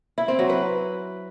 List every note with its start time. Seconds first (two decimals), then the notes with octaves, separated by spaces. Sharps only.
0.18 E4
0.28 C4
0.39 F#3
0.49 B4